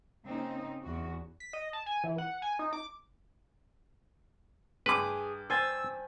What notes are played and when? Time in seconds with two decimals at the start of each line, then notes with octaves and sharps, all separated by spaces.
0.25 C#3 A#3 C4 D#4
0.83 E2 F#4
1.40 B6
1.53 D#5
1.73 A5
1.86 G#5
2.04 E3
2.18 F#5
2.42 G#5
2.59 D#4
2.73 D6
4.86 G2 G#4 B4 D6
5.50 C5 G#5 E6 A6